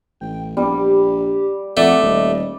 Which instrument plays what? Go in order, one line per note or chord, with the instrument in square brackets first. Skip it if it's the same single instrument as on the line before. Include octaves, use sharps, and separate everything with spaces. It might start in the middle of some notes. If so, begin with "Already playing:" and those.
[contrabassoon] A1 [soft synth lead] G5
[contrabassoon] A#1 [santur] G3 [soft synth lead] B3
[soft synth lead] G4
[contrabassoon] F2 [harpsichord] A3 [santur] D5 [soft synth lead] F#5
[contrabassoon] D#1 [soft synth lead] D#5